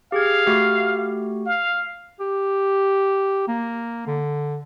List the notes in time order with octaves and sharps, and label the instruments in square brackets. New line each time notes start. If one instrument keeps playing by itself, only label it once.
[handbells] G4 G#4 G#6 [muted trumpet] F5
[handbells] A3 F#4 G4
[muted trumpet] F5
[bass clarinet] G4
A#3
D3